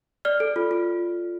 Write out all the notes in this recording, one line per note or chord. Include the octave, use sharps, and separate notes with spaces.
D5 F6
A4
F4
F4